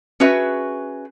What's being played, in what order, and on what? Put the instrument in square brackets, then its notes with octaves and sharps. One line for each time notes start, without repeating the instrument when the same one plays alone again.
[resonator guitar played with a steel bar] C#4 F#4 G#4 B4 E5